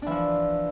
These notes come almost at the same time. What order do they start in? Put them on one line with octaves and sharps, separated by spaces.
D4 E3 F3